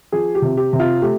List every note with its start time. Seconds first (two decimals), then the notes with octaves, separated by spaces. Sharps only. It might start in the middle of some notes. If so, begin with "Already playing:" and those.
0.12 F3 G#4
0.35 G4
0.42 C3
0.57 G4
0.73 C3
0.80 F4
1.02 A3 G4